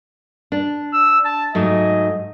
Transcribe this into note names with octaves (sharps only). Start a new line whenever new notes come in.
D4
E6
A5
G#2 F#3 A3 D#5